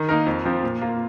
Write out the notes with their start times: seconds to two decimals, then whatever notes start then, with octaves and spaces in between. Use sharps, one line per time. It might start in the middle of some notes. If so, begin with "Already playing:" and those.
Already playing: D#3
0.09 A#3 D#4 A#4
0.26 F2
0.45 F3 C4
0.63 A#2
0.81 A#3 F4